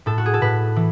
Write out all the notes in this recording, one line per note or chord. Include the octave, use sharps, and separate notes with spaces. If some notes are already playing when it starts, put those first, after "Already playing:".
A2 A4
F#4
G#4
A4
A2 B4
E3